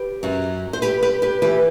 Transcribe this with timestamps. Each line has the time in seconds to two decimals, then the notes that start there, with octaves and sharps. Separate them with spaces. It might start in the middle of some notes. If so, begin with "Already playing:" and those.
Already playing: G4 B4
0.23 F#2 F#3
0.73 C5
0.82 G4 B4
1.03 G4 B4
1.22 G4 B4
1.42 E3 G4 B4